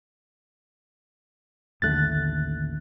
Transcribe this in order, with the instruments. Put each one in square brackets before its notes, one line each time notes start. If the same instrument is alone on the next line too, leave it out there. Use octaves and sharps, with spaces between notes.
[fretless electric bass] A1 D#2 A3 [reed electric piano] D3 F#6 A6